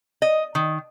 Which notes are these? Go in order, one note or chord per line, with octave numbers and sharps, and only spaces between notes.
D#5
D#3